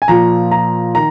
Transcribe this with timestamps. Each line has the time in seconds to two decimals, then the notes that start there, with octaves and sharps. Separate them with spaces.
0.02 G#5
0.08 A#2 F3 A#5
0.51 A#5
0.95 D#3 A#5